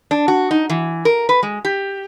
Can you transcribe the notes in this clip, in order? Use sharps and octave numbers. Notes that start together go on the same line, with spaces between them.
D4
F#4
D#4
E3
A#4
B4
G#3
G4